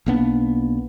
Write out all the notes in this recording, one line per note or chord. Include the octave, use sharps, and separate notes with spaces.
B1 A#3 B3 D4